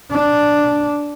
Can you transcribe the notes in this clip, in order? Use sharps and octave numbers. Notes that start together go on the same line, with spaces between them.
D4